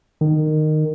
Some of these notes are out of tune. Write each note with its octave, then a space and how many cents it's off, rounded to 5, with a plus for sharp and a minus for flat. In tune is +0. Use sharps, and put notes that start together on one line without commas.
D#3 -15